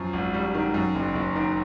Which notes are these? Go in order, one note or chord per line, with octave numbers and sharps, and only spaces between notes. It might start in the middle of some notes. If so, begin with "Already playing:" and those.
Already playing: F#2 F3
G#1
G3
D#3
F#2
F#1
F#1
D#3